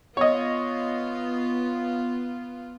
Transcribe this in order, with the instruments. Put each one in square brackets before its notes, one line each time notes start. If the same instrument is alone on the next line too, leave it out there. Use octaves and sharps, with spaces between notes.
[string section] B3 F4 [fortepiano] C#5 D#5